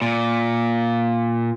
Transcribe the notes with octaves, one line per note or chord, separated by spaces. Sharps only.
A#2